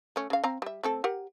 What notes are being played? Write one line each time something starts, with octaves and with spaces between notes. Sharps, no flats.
A3 C#4
C#3 F5
C4 F5 A#5
G3 E5
A3 C4 A4
G4 A#4 F#5